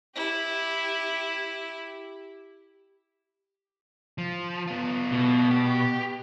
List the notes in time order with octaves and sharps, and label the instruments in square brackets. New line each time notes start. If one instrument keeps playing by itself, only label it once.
[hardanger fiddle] E4 G4
[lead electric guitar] F3
B3 F4
[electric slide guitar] B2
[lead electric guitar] G4